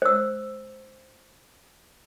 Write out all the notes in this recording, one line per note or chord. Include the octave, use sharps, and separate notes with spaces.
C5 E6